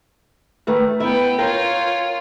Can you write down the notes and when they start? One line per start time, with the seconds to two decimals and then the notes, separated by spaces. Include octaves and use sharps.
0.67 D#3 A3 B4
1.00 B3 E4 E5 G5
1.38 F4 A#4 C#5 G5